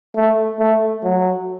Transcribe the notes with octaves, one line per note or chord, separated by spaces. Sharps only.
A3
A3
F#3